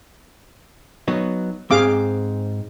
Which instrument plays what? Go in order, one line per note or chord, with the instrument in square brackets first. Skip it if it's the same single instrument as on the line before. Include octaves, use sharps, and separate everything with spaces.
[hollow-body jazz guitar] F#3 B3 D#4
[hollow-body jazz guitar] G#2 C4 [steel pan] G#4 F5 D6